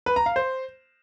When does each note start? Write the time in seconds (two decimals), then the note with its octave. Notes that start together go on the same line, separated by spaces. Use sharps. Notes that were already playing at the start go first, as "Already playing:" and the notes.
0.06 B4
0.16 A#5
0.26 F5
0.36 C5